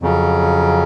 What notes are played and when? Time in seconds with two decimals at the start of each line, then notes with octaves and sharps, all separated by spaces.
0.02 F2 C#3 F#3 C#4